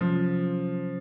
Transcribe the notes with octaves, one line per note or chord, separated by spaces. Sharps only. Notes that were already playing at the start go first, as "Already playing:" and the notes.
C3 F3 F#3 C#4